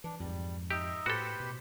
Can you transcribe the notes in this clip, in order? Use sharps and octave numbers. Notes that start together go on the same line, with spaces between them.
E3 D4
F2 G#2 G3
D#4 G4 D#5 E5
A2 F#4 G4 A4 B4 C5
B2